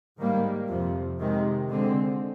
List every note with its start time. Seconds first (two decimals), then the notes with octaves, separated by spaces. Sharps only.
0.18 G#2 D#3 G3 A#3
0.68 F2 C3 F3
1.19 C3 D#3 G#3
1.69 D3 G#3 C4